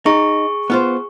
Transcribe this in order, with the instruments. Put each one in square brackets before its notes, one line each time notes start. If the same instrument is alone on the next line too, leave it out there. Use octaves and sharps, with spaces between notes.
[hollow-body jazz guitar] D#4 [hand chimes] G#4 C#6
[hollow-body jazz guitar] B3 F4 C5